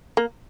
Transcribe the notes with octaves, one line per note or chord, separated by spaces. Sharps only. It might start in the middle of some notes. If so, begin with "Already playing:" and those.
A#3